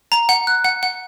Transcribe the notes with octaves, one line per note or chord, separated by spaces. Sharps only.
A#5
F#5
F#6
F#5
F#5